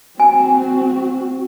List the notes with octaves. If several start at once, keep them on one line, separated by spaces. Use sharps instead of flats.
C4 F#4 G#5